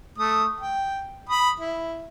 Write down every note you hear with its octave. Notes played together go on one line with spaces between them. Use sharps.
A3 D#6
G5
B5 D#6
E4